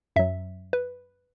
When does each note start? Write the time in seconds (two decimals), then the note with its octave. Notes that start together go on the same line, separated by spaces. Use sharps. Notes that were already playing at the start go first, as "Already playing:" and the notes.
0.16 F#2 F#3 E5
0.73 B4